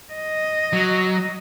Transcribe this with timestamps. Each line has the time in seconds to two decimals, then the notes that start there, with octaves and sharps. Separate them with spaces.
0.14 D#5
0.73 F#3